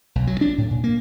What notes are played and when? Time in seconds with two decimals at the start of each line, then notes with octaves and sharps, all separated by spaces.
0.15 B1
0.27 F#3
0.41 D4
0.58 A2
0.71 A#2
0.84 A#3